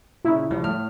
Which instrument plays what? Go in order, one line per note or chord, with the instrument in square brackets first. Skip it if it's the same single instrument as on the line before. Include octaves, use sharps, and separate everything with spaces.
[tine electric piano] A#2 C#3 [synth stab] E4
[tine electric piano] C#2 F3 G3
A2 F6